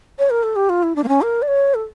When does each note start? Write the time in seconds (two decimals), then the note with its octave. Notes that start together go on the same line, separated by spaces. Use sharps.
0.19 C#5
0.30 A#4
0.43 A4
0.56 G4
0.69 F4
0.83 E4
0.96 D4
1.04 A#3
1.08 C#4
1.22 A#4
1.42 D5
1.48 C#5
1.75 A4